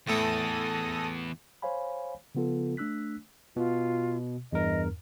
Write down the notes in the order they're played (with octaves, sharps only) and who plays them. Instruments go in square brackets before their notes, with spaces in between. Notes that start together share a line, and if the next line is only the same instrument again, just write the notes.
[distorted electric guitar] E2 E3 [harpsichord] A2 A3 E4 [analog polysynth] A4 D#6 A#6
[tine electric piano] C5 C#5 F5 G#5 B5
C#3 F3 B3 F4 A4
A3 D4 E6 F#6 B6
[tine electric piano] B2 [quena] F4
[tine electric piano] E2 G2 A#4 [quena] D#5